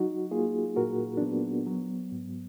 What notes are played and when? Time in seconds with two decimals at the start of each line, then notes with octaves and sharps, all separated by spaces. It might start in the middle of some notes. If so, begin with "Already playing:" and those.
Already playing: F#3 D#4 F#4
0.31 A#3 F4 G#4
0.76 A#2 F#4 A#4
1.17 D4
1.21 F#3 B3
1.67 F#3
2.12 G#2